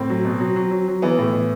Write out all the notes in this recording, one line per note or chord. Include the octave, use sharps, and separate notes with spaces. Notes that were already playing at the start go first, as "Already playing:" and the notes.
Already playing: A2 C4
F#3
B2
F#3
F#3
F#3
F#3
E3 B3
A2
E3